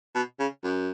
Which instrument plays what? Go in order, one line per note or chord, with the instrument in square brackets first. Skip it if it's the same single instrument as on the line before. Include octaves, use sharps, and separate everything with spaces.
[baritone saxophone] B2
C#3
F#2